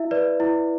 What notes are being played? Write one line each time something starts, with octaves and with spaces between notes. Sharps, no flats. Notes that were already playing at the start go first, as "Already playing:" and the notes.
Already playing: E4 E5
B4 D5
E4